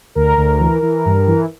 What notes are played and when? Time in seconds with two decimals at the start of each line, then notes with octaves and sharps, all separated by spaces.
0.15 D2 A#4
0.37 D2
0.60 E3
0.82 E3
1.05 G2
1.27 E3